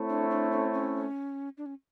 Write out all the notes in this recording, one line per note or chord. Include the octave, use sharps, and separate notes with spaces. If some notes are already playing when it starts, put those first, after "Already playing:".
Already playing: A3 C4 E4 A4 C#5
D4
D4
D4
C#4
C#4
D4
C#4